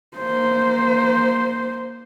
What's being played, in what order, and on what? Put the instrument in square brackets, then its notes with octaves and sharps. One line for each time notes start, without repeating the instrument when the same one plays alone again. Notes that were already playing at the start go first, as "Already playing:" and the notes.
[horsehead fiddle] A#3 C5